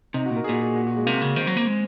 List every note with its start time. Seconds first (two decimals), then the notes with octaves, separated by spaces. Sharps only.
0.14 C3 D#4
0.26 F#4
0.30 A#2
0.36 A#4
0.44 G#4
0.49 A#2 F#4
0.62 G#4
0.76 F#4
0.87 F#4
0.97 G#3
1.07 C3 A#3
1.21 C#3
1.36 D#3 C4
1.47 F#3
1.57 A#3
1.67 G#3